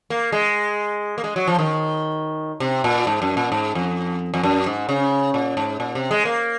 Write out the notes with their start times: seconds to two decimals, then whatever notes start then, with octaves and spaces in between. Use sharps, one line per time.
0.10 A#3
0.32 G#3
1.18 A#3
1.24 G#3
1.36 F#3
1.48 F3
1.59 D#3
2.60 C3
2.84 A#2
3.07 G#2
3.22 F#2
3.37 A#2
3.52 G#2
3.75 F2
4.34 F2
4.43 F#2
4.66 G#2
4.89 C#3
5.34 A#2
5.57 G#2
5.80 A#2
5.95 C3
6.11 G#3
6.25 A#3